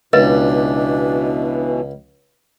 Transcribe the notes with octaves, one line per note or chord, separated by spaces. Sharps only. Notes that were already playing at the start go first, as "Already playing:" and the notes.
C#2 B2 E3 D4 B4 D#5